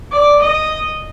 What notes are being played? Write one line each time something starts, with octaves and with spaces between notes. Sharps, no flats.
D5
D#5